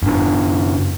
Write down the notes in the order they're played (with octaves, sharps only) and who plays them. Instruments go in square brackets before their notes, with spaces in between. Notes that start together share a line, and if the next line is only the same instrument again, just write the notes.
[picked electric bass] F#1 D4